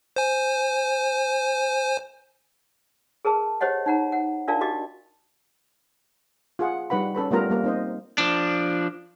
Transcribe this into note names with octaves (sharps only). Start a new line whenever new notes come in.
C5 G#5
G#4 A#4 B4 A5
G4 C5 C#5 D#5 F#5
D#4 F#5 A#5
F#5
D4 F4 A#4 D5 F5 A5
F#4 G4 D#5 D6
F4 G#4 F#5
G3 D#4 B4 F#5 B5
C#4 A4 B4 B5
G3 A3 B3 F4 A#4 A#5
G3 A#3 A#4
C4 D#4 C5 D#5
F3 D4